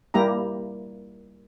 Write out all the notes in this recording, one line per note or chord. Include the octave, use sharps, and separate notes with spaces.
G3 A#3 E4 G4 A#5